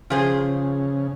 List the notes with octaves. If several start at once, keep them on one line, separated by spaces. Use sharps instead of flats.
C#3 F3 G#4 C5